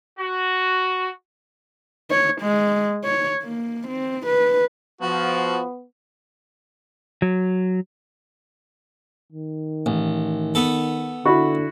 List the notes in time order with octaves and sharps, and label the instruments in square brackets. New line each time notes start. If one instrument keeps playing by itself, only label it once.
[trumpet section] F#4
[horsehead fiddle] C#5
G#3
C#5
A#3
C4
B4
[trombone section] F3 [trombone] B3 [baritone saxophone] F#4
[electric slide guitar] F#3
[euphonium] D#3
[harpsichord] A1
B3 A4
[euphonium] D3 [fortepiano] E4 F#4